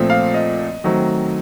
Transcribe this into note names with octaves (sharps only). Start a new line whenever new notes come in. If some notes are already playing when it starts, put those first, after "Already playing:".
Already playing: A#2 F3 A3 C4
F5
D#5
D#3 F#3 A3 C4